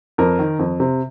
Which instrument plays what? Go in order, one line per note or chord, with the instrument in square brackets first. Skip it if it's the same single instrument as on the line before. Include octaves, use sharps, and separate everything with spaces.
[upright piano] F2 A#4
D#3
F2
C3